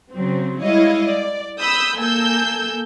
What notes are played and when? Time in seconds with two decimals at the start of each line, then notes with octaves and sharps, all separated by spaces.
0.13 C#3 F#3 C4
0.62 G3 G#3 E4 C#5 D#5 F5
1.08 D5
1.60 B5 D#6 E6 G6
1.99 A#3 A4 G#5 E6 G6